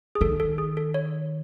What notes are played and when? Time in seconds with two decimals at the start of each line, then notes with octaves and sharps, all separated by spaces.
0.15 G#4
0.21 D#3 A4
0.40 A4
0.58 G#4
0.77 A4
0.94 C#5